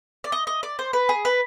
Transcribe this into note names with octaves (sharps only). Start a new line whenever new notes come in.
D5
D#5
D#5
D5
C5
B4
G#4
B4